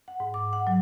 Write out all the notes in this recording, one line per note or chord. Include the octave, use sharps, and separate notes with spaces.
F#5
G#2
D6
F#5
F#3